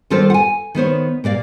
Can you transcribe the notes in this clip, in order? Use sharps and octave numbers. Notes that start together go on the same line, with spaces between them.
D#3 G3 F4 A4 A#4 C5
F#5 G#5
D#3 B3 C5 C#5
A#2 A#3 D5 F5